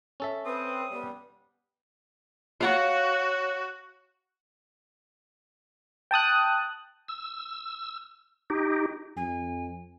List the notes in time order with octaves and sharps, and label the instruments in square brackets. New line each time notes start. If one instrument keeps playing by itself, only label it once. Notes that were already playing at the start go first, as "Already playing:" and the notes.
[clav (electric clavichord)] C#4 A4 E5
[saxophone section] C4 [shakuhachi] B4 [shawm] D#6
[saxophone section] G3 [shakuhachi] B3
[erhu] F#4 [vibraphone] C#5 [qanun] F5 F#5 C#6
[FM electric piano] G5 A5 D#6 F#6
[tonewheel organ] E6
D#4 G4
[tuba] F2 [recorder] G#5